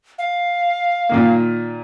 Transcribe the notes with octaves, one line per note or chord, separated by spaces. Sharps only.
F5
A#2 D#3 A#3